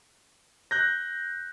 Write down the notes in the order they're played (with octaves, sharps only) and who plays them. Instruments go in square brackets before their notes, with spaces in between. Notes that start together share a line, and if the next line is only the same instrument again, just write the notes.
[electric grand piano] F#6 G6 A#6